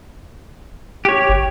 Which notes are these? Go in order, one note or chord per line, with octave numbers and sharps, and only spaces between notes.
G4 C#5
G1